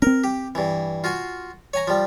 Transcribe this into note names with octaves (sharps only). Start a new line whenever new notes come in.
C4 C#4 A#4
G4
G2 E3
F4 F#4 G#5
C#5 G#5 A#5
F3 G3